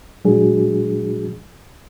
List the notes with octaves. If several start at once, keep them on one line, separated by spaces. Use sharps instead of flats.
A#2 F#3 G#3 D4 F#4 G#4